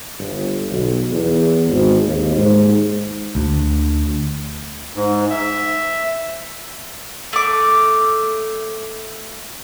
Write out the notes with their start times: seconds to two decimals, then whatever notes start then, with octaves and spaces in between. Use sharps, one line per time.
0.18 G1
0.70 B1
1.11 E2
1.69 G#1
2.05 D#2
2.37 G#2
3.35 D2
4.96 G#2
5.30 E5
7.33 A3 D6